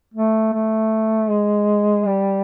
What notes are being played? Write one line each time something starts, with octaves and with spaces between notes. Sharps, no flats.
A3
A3
G#3
G3